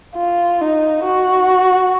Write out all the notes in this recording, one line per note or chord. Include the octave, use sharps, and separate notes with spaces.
F4
D#4
F#4